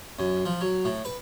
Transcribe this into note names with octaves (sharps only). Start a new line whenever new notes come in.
F#2
F3
F#3
A2
B4